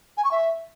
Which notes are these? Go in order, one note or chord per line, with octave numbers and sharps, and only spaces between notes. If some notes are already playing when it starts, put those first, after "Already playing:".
G#5
C#6
E5